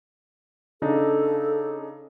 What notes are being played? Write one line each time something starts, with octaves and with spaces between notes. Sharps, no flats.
C#3 D4 D#4 A4